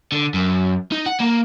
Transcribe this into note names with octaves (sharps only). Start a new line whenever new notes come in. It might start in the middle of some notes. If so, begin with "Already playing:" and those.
D3
F#2
D#4
F#5
A#3